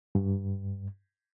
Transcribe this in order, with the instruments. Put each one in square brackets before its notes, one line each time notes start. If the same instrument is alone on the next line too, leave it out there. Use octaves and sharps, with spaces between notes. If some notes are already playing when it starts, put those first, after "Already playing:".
[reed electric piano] G2